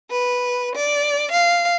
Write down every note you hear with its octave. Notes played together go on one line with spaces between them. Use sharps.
B4
D5
F5